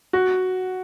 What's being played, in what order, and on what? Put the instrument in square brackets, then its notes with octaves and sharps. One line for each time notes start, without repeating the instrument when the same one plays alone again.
[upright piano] F#4